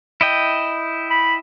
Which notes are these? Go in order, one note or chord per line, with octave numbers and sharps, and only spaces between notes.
E4 D#5 G5
B5